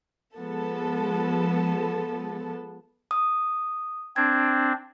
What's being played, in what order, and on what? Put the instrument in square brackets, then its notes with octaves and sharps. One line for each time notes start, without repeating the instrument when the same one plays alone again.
[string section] F3 G#3 B3 A4
[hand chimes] D#6
[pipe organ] C4 D4 [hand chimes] G#6